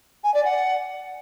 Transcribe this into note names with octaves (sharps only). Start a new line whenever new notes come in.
G#5
D5
F#5